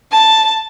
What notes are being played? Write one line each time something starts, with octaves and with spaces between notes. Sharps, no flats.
A5